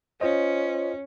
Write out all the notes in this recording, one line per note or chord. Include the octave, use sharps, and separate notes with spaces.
C#4 F4 C5 D#5